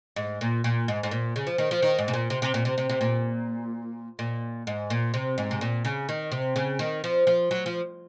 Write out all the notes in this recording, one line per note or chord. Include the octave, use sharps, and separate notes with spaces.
G#2
A#2
A#2
G#2
G#2
A#2
C#3
F3
D#3
F3
D#3
G#2
C3
A#2
C3
C3
A#2
C3
C3
C3
A#2
A#2
G#2
A#2
C3
G#2
C3
A#2
C#3
D#3
C3
C#3
D#3
F3
F3
F#3
F3